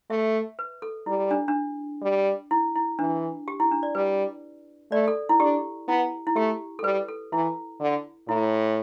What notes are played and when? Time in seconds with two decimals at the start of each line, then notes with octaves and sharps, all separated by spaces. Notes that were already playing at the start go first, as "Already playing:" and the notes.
0.10 A3 E5
0.59 B4
0.82 A4
1.06 G3 E4
1.31 D4
1.48 D4
2.02 G3
2.51 E4
2.75 E4
2.99 E3 D4
3.48 G4
3.60 E4
3.71 D4
3.83 D5
3.95 G3 B4
4.91 A3 D5
5.08 A4
5.29 E4
5.40 D4 G4
5.88 B3 E4
6.27 E4
6.36 A3 G4
6.79 A4
6.83 G3 B4
7.08 A4
7.32 E3 E4
7.80 D3
8.28 A2 E4